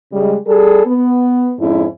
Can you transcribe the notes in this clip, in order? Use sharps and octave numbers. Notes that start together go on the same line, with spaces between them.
C#3 G3 G#3
G3 G#4 A4
B3
F2 G#2 C#4 E4